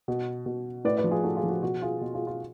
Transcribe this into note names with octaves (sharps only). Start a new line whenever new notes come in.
B2
B2
A2 B4 D5
B4 D5
F3
F4 G#4
A2 F#4 A4
F4 G#4
F3
F#4
B2 F#4
F4 G#4
B2
F4 G#4
F4